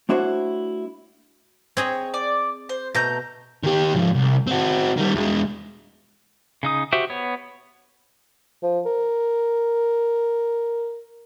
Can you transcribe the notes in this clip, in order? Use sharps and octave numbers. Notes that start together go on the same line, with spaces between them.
A3 D4 E4 F#4 C5 C#5
C4 G#4 C#5 D#5
D5
C5
B2 A3 A#5 G6
D#3 G4
G#2 F3
C2
C4 F#4
D#3 G3
E2 G#3
C#3 D#4 D#6
F#4 G4 C5 E5
B3 C#5
F3
A#4